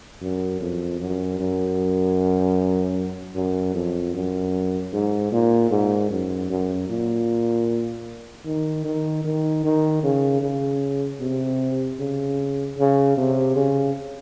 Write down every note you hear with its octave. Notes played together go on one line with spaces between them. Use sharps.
F#2
F2
F#2
F#2
F#2
F2
F#2
G#2
A#2
G#2
F#2
F#2
A#2
D#3
D#3
D#3
D#3
C#3
C#3
C3
C#3
C#3
C3
C#3